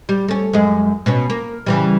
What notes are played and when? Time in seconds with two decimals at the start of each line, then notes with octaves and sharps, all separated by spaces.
0.09 G3
0.28 A3 C#4
0.53 F#2 G#3
1.06 B2 B3 C#4
1.30 A#3
1.66 C#3 E3 G3